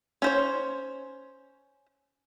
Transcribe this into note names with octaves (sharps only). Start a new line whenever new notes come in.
C#4 C5 C#5